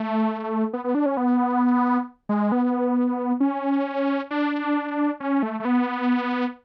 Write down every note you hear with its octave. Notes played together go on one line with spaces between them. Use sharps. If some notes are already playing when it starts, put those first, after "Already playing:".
Already playing: A3
B3
B3
D4
C#4
B3
G#3
B3
C#4
D4
C#4
A3
A3
B3